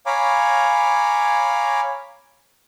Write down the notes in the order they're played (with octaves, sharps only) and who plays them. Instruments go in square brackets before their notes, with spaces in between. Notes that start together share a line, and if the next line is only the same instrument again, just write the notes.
[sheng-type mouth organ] C#5 F5 G#5 A#5 B5 D6